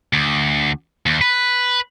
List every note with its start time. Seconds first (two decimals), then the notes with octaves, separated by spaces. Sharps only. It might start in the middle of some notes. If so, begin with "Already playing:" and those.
0.13 D2
1.06 D#2
1.21 B4